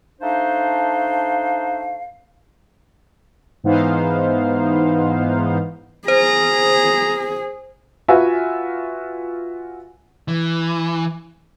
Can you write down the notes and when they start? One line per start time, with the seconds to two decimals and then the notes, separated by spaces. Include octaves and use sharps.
0.21 A3 D4 D#4 C5 F5
3.64 G#2 E3 B3 D#4 C5 F5
6.08 G#4 C5 A#5
8.08 F4 F#4 B4 E5 G#5
10.28 E3